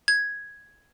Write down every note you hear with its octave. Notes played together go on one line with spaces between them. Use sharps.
G#6